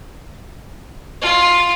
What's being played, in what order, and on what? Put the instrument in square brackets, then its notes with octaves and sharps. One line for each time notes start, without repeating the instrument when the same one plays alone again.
[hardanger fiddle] F4